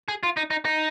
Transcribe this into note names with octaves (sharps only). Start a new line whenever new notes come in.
G#4
F4
D#4
D#4
D#4